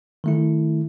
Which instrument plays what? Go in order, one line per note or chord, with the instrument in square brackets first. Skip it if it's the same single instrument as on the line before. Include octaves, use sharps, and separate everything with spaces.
[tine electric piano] D#3 A3 E4